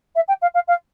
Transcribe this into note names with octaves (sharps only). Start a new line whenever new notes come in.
E5
G5
F5
F5
F5